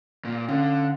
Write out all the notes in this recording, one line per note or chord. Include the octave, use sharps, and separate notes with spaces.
A#2
D3 C#4 F5